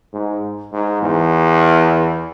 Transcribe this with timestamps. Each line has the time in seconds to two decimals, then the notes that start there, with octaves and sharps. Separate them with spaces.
0.13 G#2
0.73 G#2
1.02 E2